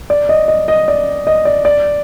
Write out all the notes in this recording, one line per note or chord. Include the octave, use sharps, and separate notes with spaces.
D5
D#5
D#5
D#5
D5
D#5
D5
D5